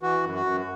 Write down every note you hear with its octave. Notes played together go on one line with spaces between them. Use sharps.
E3 F#4
F#2
F#4
F#2